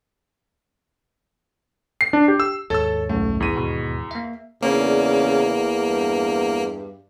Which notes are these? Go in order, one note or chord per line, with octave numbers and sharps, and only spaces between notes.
C7
D4
G4
E6
D#2 G#2 A4 C#5 E6 A6
B1 F#2 A3
E2 D#7
B2
A#3 E5
E2 C#3 A#3 D4 F5
G2